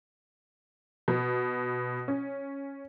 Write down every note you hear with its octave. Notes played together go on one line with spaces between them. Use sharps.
B2
C#4